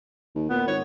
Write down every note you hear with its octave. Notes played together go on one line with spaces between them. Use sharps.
D#2
A#2 B3
G#1 C#5